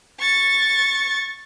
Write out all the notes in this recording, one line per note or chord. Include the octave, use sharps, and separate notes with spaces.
C#6 A6